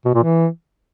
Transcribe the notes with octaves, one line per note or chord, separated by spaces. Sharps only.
B2
A#2
E3